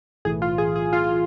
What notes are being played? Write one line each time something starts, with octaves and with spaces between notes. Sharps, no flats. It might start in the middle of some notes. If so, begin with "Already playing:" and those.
B1 A2 E3 G#4
F4
G#4
G#4
F4